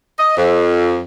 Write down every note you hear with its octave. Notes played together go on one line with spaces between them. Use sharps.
D#5
F2